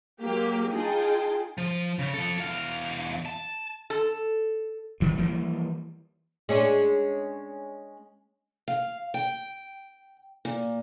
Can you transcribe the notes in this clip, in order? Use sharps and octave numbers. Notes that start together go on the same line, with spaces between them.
F#3 G#3 A#3 G4
D#4 F4 G#4 G5 A5
F3
C#3
F3 A4
E2 F5
A5
A4
G2 D#3 G3
E3 F3 G3 A#3
G#3 C#4 D4
F5
G5
A#2